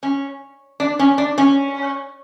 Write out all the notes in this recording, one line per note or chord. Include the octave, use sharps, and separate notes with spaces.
C#4
D4
C#4
D4
C#4